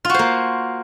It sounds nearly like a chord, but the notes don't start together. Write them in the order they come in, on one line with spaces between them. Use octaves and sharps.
F4 F#4 C5 A#3